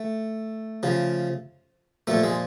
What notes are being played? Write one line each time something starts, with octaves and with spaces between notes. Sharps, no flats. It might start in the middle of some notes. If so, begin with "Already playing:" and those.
Already playing: A3
C#3 F3
A#2 F3 A3
G#3